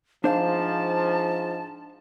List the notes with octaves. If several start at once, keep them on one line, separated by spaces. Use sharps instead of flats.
G#2 F3 D4 C5 F5 A5